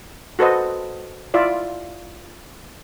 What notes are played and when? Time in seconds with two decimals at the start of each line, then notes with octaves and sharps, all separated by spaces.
0.39 F#4 A4 B4 C5 D#5 F#5
1.34 E4 F4 D5 E5